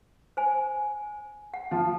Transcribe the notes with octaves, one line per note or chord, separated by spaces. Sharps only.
C5 G#5
F#5
F3